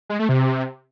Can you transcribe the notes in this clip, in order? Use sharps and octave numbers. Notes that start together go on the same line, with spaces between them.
G#3
A3
C3